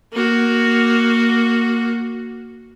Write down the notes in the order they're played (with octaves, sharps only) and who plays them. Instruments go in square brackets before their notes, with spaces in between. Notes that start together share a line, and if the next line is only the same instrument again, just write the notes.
[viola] A#3 F#4